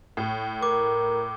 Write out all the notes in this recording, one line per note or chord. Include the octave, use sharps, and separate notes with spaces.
A2
A#4 D6